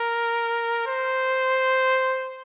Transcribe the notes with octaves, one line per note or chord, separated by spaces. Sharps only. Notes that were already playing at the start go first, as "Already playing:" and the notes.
Already playing: A#4
C5